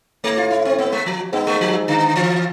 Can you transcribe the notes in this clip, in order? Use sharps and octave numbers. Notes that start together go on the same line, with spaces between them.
A2 A3
F4
E4
C4
B3
G#3
F3
G#2 B3
G#3
F3
D3
E3